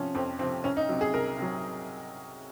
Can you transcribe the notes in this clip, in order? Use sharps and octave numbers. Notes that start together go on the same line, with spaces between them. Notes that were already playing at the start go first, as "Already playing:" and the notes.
Already playing: C3 F3 C#4
F2 C4
C3 F3 C4
C2 C#4
D#4
C3 F#3
G#4
C2 A#4
C3 F#3